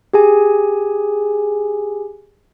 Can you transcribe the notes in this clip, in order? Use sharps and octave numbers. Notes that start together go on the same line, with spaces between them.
G4 G#4 G#5